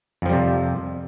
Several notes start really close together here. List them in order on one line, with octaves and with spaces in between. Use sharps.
F2 F3 G3 C3